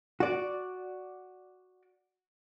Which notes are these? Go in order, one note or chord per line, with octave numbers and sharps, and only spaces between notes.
F#4 D5